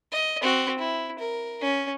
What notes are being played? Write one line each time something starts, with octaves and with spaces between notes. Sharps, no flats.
D#5
C4 F#4
E4
A#4
C#4